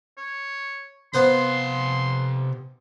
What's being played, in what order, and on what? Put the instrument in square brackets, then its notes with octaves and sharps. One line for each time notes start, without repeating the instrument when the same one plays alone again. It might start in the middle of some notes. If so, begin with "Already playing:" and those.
[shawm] C#5
[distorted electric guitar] C3 F5 [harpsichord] B3 C5 A#5 [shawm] C6